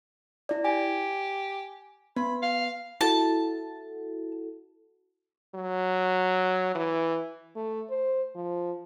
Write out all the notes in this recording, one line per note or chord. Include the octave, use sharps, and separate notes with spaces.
E4 D5
G4 G#5
B3 B5
F5
E4 F#4 A4 A5
F#3
E3
A3
C5
F3